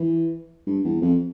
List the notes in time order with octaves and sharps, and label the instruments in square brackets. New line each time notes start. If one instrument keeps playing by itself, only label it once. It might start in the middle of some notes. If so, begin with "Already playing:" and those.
Already playing: [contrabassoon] E3
G2
E2
F2